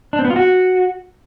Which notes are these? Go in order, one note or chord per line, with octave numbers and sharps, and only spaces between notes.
D4
C4
B3
F4
F#4